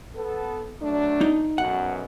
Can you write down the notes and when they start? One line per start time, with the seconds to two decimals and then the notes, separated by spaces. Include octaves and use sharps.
0.15 B3 A4
0.81 F#3 A3 D4
1.21 D#4
1.58 B1 F#2 B2 F#5